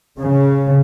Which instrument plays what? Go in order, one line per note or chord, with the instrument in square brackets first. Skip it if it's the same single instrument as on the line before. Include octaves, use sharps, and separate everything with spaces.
[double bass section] C#3